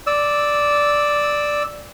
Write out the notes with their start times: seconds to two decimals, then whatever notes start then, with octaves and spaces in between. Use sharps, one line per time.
0.07 D5 E6